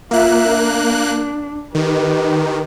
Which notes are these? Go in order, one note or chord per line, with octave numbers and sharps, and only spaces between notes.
A#3 F4 E5 F#6
D4
D#3 G4 B4